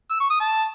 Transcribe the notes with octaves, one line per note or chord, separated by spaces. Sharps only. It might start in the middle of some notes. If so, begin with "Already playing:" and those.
E6
C#6
D#6
A5